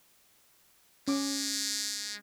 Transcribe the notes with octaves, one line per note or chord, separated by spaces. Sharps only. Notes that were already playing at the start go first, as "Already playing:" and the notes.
G#3 C#4 D6